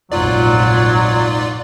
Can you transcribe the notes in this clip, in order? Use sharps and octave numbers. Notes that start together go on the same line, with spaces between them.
F1 A#1 G#2 F#3 F4 D5